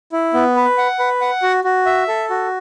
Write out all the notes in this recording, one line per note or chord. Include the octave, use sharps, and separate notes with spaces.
E4
B3
B4
F#5
B4
F#5
F#4
F#4
E5
A4
F#4